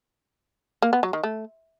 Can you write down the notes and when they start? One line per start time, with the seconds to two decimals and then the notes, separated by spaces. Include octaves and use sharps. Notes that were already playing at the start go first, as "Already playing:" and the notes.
0.82 A#3
0.93 B3
1.03 F#3
1.13 D#3
1.24 A3